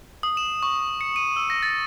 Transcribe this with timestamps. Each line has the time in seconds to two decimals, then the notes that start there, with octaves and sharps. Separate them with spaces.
0.23 D#6
0.37 E7
0.63 C#6
1.01 C#7
1.16 D#7
1.36 E6
1.50 A#6
1.63 A6